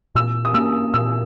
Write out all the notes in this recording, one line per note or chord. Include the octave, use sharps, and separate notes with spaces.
A#2 E6
D#6
A#3 C#4 E6
A#2 E6